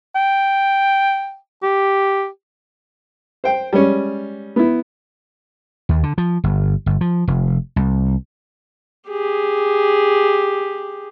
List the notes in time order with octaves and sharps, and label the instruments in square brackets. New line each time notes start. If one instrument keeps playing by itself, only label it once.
[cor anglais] G5
G4
[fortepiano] C5 G5
G3 G#3 C#4
B3 E4
[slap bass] D#2
D3
F3
G1
G1
F3
F1
C2
[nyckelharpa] G4 G#4